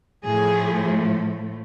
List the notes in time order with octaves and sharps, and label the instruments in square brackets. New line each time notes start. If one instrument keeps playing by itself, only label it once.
[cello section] A2 F3 A3 G#4